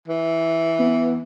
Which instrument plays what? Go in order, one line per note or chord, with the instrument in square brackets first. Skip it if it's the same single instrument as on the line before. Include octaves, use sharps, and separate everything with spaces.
[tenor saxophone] E3
[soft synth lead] B3